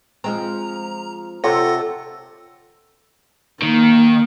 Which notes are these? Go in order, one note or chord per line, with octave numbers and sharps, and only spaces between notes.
F3 G#3 C4 A#5
C3 F4 A4 C#5 F#5 A#6
D#3 A#3